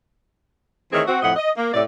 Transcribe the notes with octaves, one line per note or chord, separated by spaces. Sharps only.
D#3 E3 A3 C4 G#4 C#5
C4 F#4
F2 A2 F3 D#5 F#5
D#5
A#3
A2 C3 A4 D5